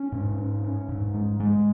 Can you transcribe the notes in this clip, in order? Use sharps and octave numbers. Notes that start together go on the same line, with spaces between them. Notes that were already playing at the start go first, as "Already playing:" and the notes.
Already playing: C#4
G#2
C#4
C#4
G#2
G#3
G#3